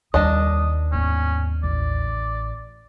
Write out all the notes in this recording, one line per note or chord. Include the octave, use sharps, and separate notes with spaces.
D#2 D#3 G3 D4 D#5 D#6
G#2 B3 C#4
A1 D5